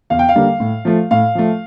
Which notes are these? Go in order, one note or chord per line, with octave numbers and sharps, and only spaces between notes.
E2 F5
G5
F5
D3 G3 A#3
A2
F3 A3
A2 F5
F3 A3